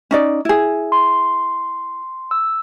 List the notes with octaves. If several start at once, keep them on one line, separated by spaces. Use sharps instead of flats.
C#4 D#4 D5
E4 G#4
C6
E6